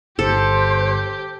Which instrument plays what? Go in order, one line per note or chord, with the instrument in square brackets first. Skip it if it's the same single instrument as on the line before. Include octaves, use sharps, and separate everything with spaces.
[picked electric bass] G1 [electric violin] G4 [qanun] A4 [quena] C5